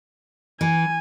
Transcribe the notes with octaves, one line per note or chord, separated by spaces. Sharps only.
E3 G#5